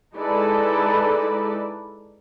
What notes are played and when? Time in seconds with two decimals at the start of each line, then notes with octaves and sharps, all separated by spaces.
0.15 G#3 D#4 E4 A4 B4 D5